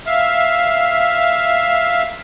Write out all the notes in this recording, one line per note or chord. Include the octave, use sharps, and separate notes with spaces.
E5 F5